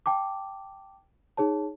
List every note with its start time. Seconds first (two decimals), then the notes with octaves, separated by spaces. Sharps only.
0.06 G5 A5 D6
1.37 D#4 G#4 C#5 A5